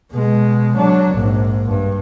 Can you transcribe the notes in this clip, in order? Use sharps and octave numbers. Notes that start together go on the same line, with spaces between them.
B2 G#3
F#3 D4
A#1 G#2
G2